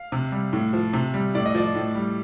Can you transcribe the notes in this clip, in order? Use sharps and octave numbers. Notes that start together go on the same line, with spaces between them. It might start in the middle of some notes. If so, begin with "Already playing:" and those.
Already playing: F5
C3
G3
A2
F3
C3
G3
A2 D5
D#5
F3 D5
A2
G3